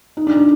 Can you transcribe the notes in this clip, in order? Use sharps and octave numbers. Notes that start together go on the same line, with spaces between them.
D#4
D4
D4